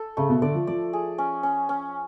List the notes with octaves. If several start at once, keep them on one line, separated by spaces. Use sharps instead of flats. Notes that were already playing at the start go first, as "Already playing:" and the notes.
Already playing: A4
C#3 A3
B2
D3 D5
F3
F3 D5
G#4
C#4
C#4
C#4